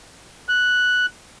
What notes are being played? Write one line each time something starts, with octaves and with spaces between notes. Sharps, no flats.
F#6